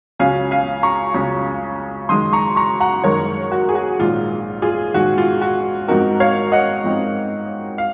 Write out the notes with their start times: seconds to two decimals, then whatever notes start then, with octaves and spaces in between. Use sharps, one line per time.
0.20 C#2 C#3 F#3 C#4 F5 G#5
0.51 F5 G#5
0.83 A#5 C#6
1.14 C#2 C#3 F#3 C#4
2.09 F#2 D#3 G#3 C6 D#6
2.33 A#5 C#6
2.56 A#5 C#6
2.80 F#5 A#5
3.04 F#2 D#3 G#3 A#4 C#5
3.52 F#4
3.69 G#4
3.75 F#4
3.99 A#1 G#2 D#3 F4
4.62 F4 G#4
4.94 A#1 G#2 D#3 F#4
5.18 F4
5.42 F#4
5.88 G#2 F3 C4 D#4 F#4 A#4
6.20 C#5 F5
6.52 D#5 F#5
6.84 G#2 F3 C4 D#4
7.78 F5